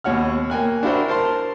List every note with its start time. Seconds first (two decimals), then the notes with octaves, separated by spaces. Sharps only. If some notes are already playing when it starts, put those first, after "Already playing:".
0.04 D#2 B2 C#5 F#5 F6
0.50 A#3 G5 G#5 F#6
0.83 D4 E4 F#4 A#4 C5
1.08 A#4 C5 A5 C6